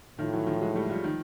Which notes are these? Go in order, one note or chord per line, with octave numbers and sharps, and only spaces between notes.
A2 D#3 F3
E3 F#3
D#3 F3
F#3 G#3
G3 A3
F3 G3
D#3 F3